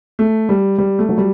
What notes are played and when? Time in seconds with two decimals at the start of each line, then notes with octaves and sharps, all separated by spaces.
0.19 A3
0.49 G3
0.78 G3
0.99 A3
1.09 F#3
1.18 G3